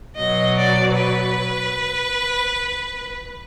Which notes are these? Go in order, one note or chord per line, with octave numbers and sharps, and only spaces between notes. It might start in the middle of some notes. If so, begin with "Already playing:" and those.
B2 F#3 D#5
D5
B4